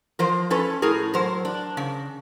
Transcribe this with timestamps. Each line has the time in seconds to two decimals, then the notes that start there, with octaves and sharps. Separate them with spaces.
0.19 F3 A#4 C5
0.50 C#4 A4 B4
0.82 A2 G#4 A#4
1.14 F#3 A#4 C5
1.45 D4
1.77 C#3